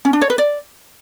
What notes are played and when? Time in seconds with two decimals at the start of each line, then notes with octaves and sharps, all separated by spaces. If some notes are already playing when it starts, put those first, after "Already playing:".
0.05 C#4
0.13 D4
0.21 C#5
0.30 B4
0.38 D5